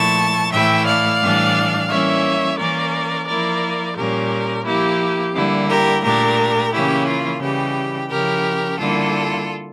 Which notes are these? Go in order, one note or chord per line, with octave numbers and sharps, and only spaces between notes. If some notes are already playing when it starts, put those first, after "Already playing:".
Already playing: A#2 F3 A3 E4 A5 C#6
A2 E3 A3 E4 E5 G5
D5 F5
A2 E3 G3 D4
E3 G3 A#3 C#4 E4 C#5 E5
E3 A#3 C#4 A#4 D5
F3 A#3 E4 A#4 D5
A#2 G3 C#4 G4 A#4
F3 A#3 E4 G4
D3 G3 A#3 E4
G4 A#4
A#2 A3 D4 G4 A#4
C#3 E3 A#3 C#4 E4 G4
F4
C#3 E3 G3 G4
C#3 F3 C#4 E4 G4 A#4
D3 G3 A#3 E4 F4 A4